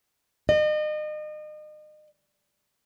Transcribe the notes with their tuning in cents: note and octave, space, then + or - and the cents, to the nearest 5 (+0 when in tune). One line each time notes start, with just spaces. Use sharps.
D#5 -35